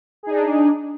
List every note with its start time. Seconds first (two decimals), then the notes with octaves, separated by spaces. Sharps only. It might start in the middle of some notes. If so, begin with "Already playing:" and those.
0.23 G#4
0.27 D#4
0.31 D4